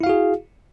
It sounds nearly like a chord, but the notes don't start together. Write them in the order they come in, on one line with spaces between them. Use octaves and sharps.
E4 F5 F#4 G#4